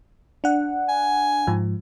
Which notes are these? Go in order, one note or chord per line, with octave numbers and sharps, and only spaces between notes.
D4 F#5
G#5
G#2 F3